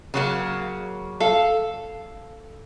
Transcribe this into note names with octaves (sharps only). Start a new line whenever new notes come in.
C#3 F#3 A#3
A4 F5